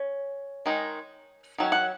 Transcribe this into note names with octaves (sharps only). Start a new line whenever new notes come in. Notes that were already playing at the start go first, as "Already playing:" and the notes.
Already playing: C#4
D#3 G#3 D#4
D#3 F#3 C#4
F#5